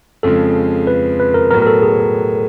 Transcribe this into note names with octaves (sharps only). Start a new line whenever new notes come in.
F2 C#3 F3 G#3 A4
B4
B4
A#4
A2 F#3 B3 A#4
A#4
A4
G#4